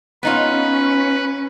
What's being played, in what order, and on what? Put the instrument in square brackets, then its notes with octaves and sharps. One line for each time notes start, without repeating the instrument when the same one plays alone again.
[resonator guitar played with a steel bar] B3 D#4 F4 [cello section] C#4 [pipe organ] B4